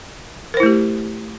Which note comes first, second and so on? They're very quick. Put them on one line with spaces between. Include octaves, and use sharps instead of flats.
A#4 C5 E4 A3 G4